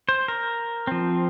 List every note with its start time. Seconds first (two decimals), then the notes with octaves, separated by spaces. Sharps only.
0.09 C5
0.28 A#4
0.87 F3 C4